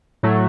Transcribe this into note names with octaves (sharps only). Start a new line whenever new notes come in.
A2 F#3 A3